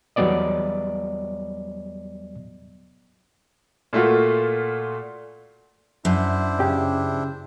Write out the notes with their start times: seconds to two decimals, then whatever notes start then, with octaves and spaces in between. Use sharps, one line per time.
0.16 E2 F#3 G3 B3 D5 D#5
3.93 A#2 A3 F4 F#4
6.05 F#2 D4 E4 C5
6.60 C#3 G4